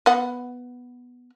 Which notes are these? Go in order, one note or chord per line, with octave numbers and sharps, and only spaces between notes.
B3 F#5